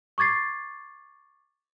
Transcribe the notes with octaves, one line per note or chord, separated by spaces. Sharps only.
C#6 D6 G#6 A6 C7